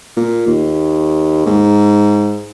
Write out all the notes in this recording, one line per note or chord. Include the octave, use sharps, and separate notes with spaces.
A#2
D#2
G#2